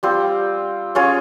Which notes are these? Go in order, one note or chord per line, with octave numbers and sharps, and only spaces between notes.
G3 C4 F4
C#4 F4 G#4 C#5